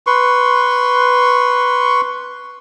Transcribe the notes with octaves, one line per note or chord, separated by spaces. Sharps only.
B4 C6 C#6